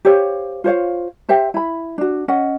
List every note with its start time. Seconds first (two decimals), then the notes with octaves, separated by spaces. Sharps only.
0.05 G4 C5 C#5 F5
0.64 F4 C5 C#5 F5
1.29 G4 C5 E5 G5
1.54 E4 B5
1.98 D4 F#4
2.28 C#4 D#5 F#5